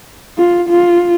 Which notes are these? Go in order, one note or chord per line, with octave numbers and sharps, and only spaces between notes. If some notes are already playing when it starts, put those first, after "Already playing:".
F4
F4